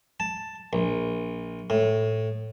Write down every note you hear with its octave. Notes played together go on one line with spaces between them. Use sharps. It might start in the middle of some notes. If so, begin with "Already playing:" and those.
A5
A#1
A2